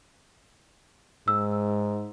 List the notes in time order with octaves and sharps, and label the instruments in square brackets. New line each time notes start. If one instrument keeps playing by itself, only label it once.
[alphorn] G#2 [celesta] E6